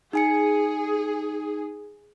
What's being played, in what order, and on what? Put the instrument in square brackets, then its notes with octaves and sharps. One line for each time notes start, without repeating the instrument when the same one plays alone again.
[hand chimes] D#4 G#5 C#7 [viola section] G#4